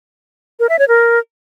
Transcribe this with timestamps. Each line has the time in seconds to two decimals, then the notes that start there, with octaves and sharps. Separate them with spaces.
0.60 A#4
0.69 E5
0.79 C#5
0.88 A#4